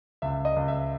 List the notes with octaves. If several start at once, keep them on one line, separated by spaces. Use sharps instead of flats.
C#2 E5
D#5
C#2
E5